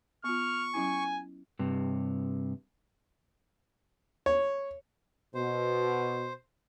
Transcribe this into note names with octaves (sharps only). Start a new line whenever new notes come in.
B3 F4 C#6 F6
F#3 C#4 E4 G#5
G2 C3
C#5
B2 C5